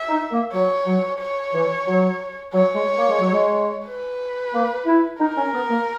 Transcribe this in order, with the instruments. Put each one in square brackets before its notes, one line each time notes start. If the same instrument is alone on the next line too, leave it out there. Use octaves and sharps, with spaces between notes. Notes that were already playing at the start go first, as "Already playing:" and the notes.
Already playing: [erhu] E5
[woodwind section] D#4
A#3
[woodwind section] F#3 [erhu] C#5
[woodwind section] F#3
[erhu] C#5
[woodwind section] E3
F#3
[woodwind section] F#3 [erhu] C#5
[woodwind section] G#3
A#3
G#3
F#3
G#3
[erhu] B4
[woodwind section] A#3
E4
[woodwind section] D#4 [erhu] A#4
[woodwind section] C#4
B3
A#3